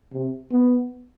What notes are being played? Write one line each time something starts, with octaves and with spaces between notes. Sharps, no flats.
C3
B3